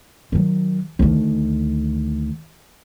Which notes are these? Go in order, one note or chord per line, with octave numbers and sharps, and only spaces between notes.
D#3 F#3
D2 D#3